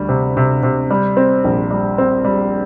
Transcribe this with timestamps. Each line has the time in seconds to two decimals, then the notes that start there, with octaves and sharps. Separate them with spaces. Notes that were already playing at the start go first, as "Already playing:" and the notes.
Already playing: D2 G3
0.09 C3
0.37 C3
0.63 C3
0.90 G3
1.17 C4
1.44 A#1
1.71 G3
1.98 C4
2.25 G3